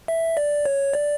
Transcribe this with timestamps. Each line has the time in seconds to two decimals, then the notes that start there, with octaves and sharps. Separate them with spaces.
0.08 E5
0.37 D5
0.66 C#5
0.93 D5